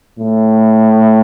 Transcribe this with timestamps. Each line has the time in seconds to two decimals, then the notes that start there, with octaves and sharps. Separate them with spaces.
0.19 A2